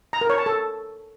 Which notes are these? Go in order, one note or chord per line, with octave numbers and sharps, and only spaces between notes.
A#5
A#4
C#5
A5
A4